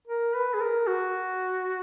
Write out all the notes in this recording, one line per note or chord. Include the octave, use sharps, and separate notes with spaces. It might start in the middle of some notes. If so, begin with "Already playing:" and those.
A#4
B4
G#4
A#4
F#4